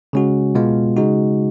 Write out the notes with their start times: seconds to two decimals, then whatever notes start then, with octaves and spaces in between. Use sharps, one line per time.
0.13 C#3 G#3 C#4 F#4
0.55 B2 G#3 B3 F4
0.97 C#3 G#3 D#4 F#4